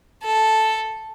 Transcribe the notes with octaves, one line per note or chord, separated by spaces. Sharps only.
A4